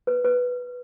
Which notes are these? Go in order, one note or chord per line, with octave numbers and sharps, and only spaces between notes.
B4
B4